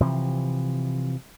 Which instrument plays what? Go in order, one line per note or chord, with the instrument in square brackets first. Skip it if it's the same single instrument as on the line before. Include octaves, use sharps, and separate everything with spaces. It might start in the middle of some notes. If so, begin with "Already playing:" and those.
[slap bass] C3 E3 F3